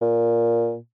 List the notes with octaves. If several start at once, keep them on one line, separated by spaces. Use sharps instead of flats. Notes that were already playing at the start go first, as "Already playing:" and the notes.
A#2